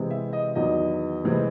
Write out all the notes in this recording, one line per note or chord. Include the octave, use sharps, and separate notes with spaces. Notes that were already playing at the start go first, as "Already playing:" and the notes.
Already playing: C3 E3 G#3 C4
E5
D#5
E2 D#3 F#3 D#5
C3 E3 G#3 C4